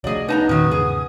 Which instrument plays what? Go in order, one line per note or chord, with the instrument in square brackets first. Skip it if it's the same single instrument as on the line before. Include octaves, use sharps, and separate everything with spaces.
[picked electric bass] C2 F3 A3 [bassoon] F#3 [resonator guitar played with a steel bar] G#4 D5 [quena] D#5
[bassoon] B3 [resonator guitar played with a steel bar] D#4 A5 A#5
[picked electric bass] E1 A#2 C#4 [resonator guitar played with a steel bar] D#3 F#3 [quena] D#6
[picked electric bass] E2 G#2 C#3 [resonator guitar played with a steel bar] G#4